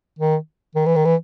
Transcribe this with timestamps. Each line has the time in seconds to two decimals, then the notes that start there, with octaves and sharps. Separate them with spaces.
0.19 D#3
0.75 D#3
0.86 E3
0.96 D#3
1.05 E3